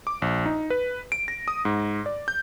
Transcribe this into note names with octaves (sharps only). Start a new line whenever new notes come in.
D6
A#1
D#4
B4
D7
A#6
D#6
G#2
D5
G6